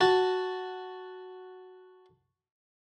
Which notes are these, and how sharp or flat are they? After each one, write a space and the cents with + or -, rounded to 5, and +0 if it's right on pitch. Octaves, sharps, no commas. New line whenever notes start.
F#4 +0 A5 +0